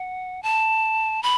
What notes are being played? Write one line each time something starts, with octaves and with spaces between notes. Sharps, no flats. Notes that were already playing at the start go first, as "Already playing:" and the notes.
Already playing: F#5
A5
B5